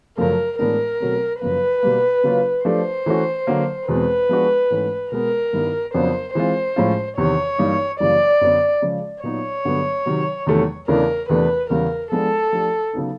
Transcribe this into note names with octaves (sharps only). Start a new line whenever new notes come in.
F#2 C#3 F3 A3 A#4
A2 E3 G#3 B3 D4 A#4
B2 F#3 A3 C4
F#2 C#3 F3 A#3 B4
B2 G3 A#3
C#3 F#3 A#3 C#4 F4
F3 A3 D4 G4 C5
E3 A3 C#4 F#4
D3 F#3 A#3
E2 B2 G#3 C4 B4
F3 G#3 B3 D4 F#4
G#2 E3 A3 C#4
B2 G#3 B3 A#4
G2 D#3 G3 B3 E4
F2 C#3 F#3 B3 D4 C5
E3 G#3 C4 F4 C5
A2 F3 G#3 C#4 F4
E2 C3 D#3 C#5
G2 E3 G3 A#3 D#4
F#2 C#3 E3 G3 A#3 D5
F#2 D3 F#3 B3
C#3 F3 G#3
A#2 F#3 B3 D#4 C#5
G2 D3 F#3 B3
C3 D#3 F#3
E2 C3 D#3 F#3 A3
E2 C#3 E3 A3 D4 A#4
E2 C3 E3 A3 D4 B4
E2 C#3 E3 G3 A#4
F3 G#3 B3 D4 A4
F3 A3 D4 G4
C#3 F#3 B3 D#4